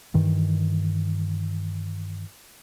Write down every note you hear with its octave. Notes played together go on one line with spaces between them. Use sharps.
G2 D#3 E3